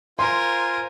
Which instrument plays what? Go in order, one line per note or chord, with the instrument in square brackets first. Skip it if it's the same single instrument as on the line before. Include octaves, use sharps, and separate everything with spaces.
[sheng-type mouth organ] F4 C5 G#5 [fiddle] A#4 [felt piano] C6